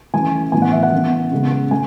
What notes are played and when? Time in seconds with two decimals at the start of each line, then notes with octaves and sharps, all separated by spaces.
0.14 E3 A3 C#4 G#5
0.52 A2 E3 B3 G#5
0.62 F#5
0.72 E5
0.83 F#5
0.92 E3 B3
1.32 C#3 G#3 B3
1.71 A3 G#5